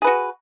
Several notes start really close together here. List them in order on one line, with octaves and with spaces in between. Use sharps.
G#4 B4 F#4